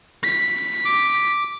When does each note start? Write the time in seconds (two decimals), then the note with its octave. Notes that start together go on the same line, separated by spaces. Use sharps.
0.24 B6
0.85 D6